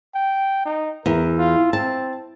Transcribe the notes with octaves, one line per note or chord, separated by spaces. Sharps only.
G5
D#4
E2 A#4
F4
C4 A5